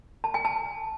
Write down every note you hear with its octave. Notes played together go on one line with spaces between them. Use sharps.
A5
G#5
A5